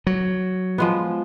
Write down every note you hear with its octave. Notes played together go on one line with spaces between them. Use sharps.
F#3
F3 G#3 B3